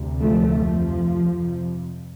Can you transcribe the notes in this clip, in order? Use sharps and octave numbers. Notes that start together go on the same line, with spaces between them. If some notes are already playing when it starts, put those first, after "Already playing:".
Already playing: D2 C3
F3 A3
F2 C3 F3
F2 C3